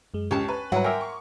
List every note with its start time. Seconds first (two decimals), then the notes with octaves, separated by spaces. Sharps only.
0.14 F#2 G#3
0.31 C#2 C#4 G4 A5
0.48 B4
0.72 G#2 F#3 G3 E4 B4 F#5
0.84 A#4 E5 G5 G#5 C6 D6
1.01 C#6